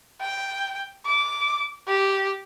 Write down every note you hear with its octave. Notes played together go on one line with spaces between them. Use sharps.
G5
D6
G4